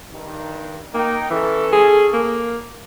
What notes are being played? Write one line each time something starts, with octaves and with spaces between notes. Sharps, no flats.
G2 D#3
A#3 D#4 G5
E3 C#4 A4
G#4
A#3